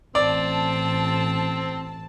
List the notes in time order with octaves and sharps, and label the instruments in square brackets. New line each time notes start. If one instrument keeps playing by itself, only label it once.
[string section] A1 A5 [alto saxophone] C4 [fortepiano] D5